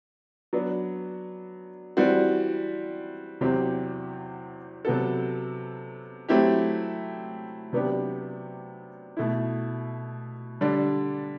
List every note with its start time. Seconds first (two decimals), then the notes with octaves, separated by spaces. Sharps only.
0.53 F#3 B3 D4
1.97 E3 G3 C4 F#4
3.41 E2 C3 F#3 C4 G4
4.85 C3 F#3 B3 F#4 A4
6.29 F#3 A3 C4 E4 G4
7.73 C3 F#3 B3 D4 G4
9.17 B2 A3 E4
10.61 D3 G3 D4